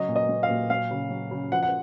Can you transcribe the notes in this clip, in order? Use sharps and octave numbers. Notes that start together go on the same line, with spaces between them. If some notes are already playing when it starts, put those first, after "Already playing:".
Already playing: C#3 F#3 D#5
A#2
D#5
F#3
F5
A#2
F#3 F5
C#3
F#3
C#3
F3 F#5
F#5